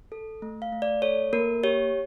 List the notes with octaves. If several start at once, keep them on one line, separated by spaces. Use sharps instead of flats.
A4
A3
F5
A3
D5
A4 C#5
A#3 A#4
G4 C#5